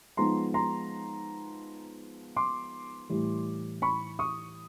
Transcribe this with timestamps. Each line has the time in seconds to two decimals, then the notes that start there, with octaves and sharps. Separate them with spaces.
0.17 F3 G#3 B3 D#4 A#5 C6
0.54 A#5 C6
2.36 C6 D6
3.10 A2 E3 G3
3.82 B5 C#6
4.19 C#6 D#6